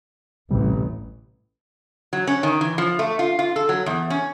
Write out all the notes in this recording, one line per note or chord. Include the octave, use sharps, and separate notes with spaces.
A1 D2 C3 G3
F#3
C#4
D#3
E3
F3
A3
F4
F4
A4
F#3
E2
C#4